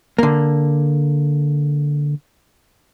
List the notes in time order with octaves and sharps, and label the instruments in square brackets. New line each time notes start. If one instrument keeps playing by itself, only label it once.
[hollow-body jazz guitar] D3 A#3